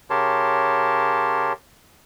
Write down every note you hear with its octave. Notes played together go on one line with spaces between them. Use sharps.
C#3 G4 A#4 C#5 A5 C6